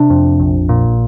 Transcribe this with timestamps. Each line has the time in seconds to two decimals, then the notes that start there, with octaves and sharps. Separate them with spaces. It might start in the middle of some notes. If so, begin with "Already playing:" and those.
Already playing: C3 D4
0.10 F2
0.40 A#1
0.69 A#2